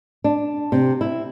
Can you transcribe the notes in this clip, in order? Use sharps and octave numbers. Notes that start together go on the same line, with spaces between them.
D4
C3
E4